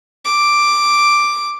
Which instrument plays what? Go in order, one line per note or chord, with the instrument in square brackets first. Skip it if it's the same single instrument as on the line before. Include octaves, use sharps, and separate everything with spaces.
[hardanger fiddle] D6